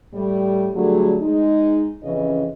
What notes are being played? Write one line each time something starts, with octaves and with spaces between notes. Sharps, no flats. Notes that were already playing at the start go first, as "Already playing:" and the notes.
A2 G3
D3 F#3 G3 A3 G#4
G#3 D#4
F2 C#3 E3 C#4 D#5